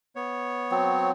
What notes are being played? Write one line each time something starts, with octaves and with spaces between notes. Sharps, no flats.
B3 C#5
F#3 C4